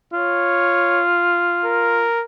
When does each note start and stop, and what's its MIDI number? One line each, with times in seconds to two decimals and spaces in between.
0.13 2.07 65
0.13 1.04 73
1.65 2.24 70